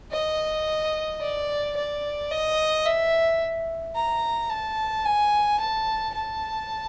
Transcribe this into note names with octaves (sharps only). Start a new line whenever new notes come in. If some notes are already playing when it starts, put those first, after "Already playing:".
D#5
D5
D5
D#5
E5
A#5
A5
G#5
A5
A5